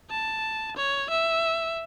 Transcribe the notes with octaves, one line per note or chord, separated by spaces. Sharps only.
A5
C#5
E5